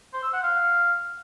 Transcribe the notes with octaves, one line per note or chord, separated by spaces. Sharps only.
C5
E6
F#5
F5